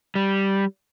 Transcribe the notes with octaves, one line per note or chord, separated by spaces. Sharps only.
G3